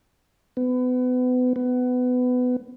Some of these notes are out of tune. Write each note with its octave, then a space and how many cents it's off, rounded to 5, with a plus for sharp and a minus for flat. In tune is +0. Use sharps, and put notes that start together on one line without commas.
B3 +30
B3 +20